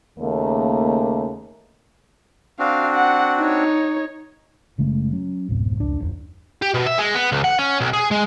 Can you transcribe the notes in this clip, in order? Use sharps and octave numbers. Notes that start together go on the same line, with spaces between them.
D#2 C#3 A3 A#3
C4 D4 F#4 F5
F#5
D#4 C#5
F#1 C#3 G#3 A3
F#3 C#4
F1 C#2 G#2 B2
F1 C#2 D4
F#1 D#2
G4
B2
E5
G#3
B3
C#2
F#5
C#4
B1
G#4
G#3